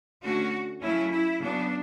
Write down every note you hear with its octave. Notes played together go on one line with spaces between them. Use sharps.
D3 A3 C#4 F#4
C#3 F#3 A3 C#4 E4
E4
C#3 F#3 B3 D4